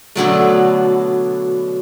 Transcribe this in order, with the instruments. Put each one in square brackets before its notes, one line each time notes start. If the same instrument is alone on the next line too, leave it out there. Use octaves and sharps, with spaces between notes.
[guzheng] B2 D3 F#3 A3